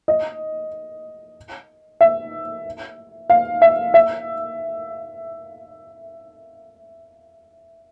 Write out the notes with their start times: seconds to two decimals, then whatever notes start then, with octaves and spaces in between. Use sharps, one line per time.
0.08 D#5
2.01 E5
3.30 F5
3.62 E5
3.94 E5